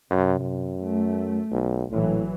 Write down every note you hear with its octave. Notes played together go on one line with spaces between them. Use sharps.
F#2 C3
F#2
A3
B1
A#1 A2 E3 F#3